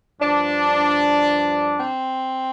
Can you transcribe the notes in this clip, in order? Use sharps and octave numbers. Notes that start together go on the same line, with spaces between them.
G2 F3 D4
C4